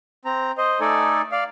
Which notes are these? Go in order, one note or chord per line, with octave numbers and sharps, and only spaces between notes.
C4 A#5
C5 D#5
A3 D#4 A4 D5 G#5
D5 F5